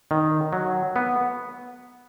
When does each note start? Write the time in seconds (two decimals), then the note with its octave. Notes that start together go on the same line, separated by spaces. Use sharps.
0.11 D#3
0.53 F#3
0.96 B3